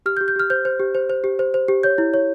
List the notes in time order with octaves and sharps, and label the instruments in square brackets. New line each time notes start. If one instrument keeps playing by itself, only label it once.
[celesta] G4 F6
G6
G4
G6
G4 F6
C5 G6
C5
G4
C5
C5
G4
C5
C5
G4
C#5 G6
E4
C#5